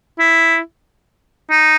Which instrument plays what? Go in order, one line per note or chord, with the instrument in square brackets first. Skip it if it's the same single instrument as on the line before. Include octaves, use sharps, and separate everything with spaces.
[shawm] E4
D#4